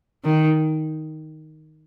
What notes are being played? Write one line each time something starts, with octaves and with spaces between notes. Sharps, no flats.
D#3